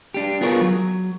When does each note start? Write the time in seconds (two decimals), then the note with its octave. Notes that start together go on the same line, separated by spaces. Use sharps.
0.14 D4 G4
0.41 B3 F4 G#4 A#4 C5 C#5
0.61 F#3